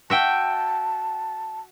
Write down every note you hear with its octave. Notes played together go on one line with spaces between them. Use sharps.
F#4 E5 G5 A5